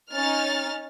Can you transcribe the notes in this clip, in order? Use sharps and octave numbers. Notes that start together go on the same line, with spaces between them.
C#4 D#4 F6 A6